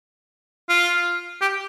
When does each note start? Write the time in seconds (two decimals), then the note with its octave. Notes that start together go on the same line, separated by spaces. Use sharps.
0.69 F4
1.41 G4